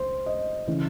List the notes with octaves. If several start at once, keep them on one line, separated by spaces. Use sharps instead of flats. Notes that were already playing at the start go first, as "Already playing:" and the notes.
Already playing: C#2 C5
D#5
C#3 E3